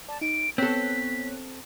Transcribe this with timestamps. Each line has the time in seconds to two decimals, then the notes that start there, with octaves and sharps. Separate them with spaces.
0.09 D5 A5
0.21 D#4 D7
0.58 B3 C4 A4 C#5 F#6 B6